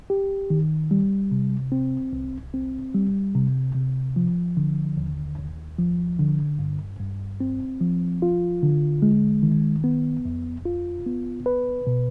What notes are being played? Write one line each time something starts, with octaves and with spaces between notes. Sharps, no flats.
G4
D#3
G3
C3
C4
C2
C4
G3
C3
C3
F3
D3
D#2
D#2
F3
D3
G2
G2
C4
F3
F4
D3
G#3
D#3
B3
F2
F4
B3
B4
B2